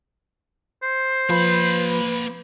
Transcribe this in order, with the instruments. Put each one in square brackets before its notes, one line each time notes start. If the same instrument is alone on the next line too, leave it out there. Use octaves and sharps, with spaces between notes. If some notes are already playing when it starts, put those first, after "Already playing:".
[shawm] C5
[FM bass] F3 [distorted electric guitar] A#3 B5 [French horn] B4